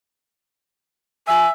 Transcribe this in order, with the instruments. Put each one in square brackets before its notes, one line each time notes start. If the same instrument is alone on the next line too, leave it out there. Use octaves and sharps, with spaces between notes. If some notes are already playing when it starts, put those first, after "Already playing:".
[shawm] E5 [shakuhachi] G#5